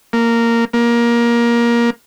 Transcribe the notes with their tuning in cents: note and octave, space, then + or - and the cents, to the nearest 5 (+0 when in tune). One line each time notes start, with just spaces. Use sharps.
A#3 -10
A#3 +20